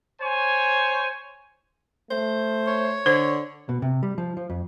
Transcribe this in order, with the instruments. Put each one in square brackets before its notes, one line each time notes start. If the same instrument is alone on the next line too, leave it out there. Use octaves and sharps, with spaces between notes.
[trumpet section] C5 C#5 G#5
[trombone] A3 [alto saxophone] C5
[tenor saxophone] C#5
[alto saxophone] D3 [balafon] C5
[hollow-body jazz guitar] B2
C3
G3
F3
F3
F2